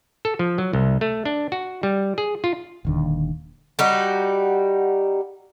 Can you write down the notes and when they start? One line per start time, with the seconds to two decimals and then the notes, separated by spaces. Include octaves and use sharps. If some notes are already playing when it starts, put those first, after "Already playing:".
0.25 A4
0.39 F3
0.58 F#3
0.73 C2
1.01 A3
1.25 D4
1.52 F#4
1.83 G3
2.18 G#4
2.44 F4
2.85 D#1 D#2 D3
3.79 G3 D#4 F#4 G4